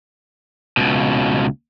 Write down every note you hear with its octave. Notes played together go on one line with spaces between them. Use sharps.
C#2 B2